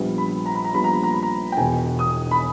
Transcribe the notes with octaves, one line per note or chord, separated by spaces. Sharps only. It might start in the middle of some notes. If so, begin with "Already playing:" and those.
Already playing: A#1 A#2 G3 B3
B5
A#5
B5
A#5
A#1 A#2 G3 B3 B5
A#5
B5
A#5
B5
A#5
G5
E1 E2 B2 G#5
D#6
B5